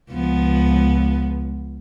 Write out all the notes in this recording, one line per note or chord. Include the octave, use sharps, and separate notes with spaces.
C#2 F3 B3